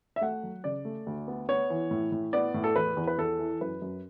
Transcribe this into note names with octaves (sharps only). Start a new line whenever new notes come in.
E5
A3 F#5
F#3
C#3 D5
A3
D2
B3
B3 C#5
E3
A2
A2
B3 D5
A2
A4
E2 B4
E2
B4
E2 A4
E3
F#2 B4
F#2